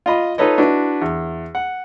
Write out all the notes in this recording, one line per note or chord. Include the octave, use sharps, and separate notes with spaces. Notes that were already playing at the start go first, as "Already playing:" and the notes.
F4 D#5 B5
D#4 F4 A4 B4 C#5 D#5
D4 E4 F#4 B4
E2
F#5